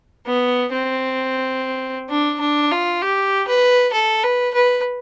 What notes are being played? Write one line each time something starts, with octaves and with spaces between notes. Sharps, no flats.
B3
C4
D4
D4
F4
G4
B4
A4
B4
B4